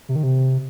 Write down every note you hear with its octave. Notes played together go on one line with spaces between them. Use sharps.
C3
D#3
C3